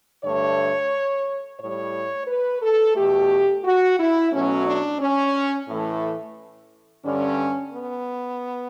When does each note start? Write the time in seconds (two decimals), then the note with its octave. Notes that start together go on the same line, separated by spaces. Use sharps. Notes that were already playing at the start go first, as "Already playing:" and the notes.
0.23 G2 D3 A3 C#5
1.60 A2 G3 C#5
2.27 B4
2.62 A4
2.95 E2 B2 A3 G4
3.64 F#4
3.98 E4
4.32 B2 F#3 A3 C#4
4.66 D4
4.99 C#4
5.68 A2 E3 A3
7.04 G2 D3 G3 C#4
7.72 B3